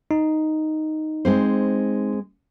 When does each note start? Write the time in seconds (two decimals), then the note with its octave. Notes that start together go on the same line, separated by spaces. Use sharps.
0.11 D#4
1.25 G#3 C4 C5